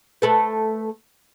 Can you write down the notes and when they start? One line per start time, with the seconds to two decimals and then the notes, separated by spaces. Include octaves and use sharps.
0.22 A3 A4 B4